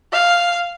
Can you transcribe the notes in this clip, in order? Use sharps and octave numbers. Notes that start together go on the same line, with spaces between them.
F5